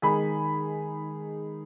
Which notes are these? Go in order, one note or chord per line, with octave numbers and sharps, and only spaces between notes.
D#3 G#3 D#4 G#4 G#5 B5